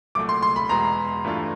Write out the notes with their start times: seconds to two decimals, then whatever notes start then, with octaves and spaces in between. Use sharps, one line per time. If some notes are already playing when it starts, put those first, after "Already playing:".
0.15 C2 A#2 F#3 A3 D6
0.29 C6
0.42 C6
0.56 B5
0.69 E2 B2 G#3 B3 A#5
1.24 G2 E3 A3 D4 F4